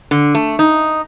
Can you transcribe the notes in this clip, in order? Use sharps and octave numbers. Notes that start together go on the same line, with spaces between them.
D3
A3
D#4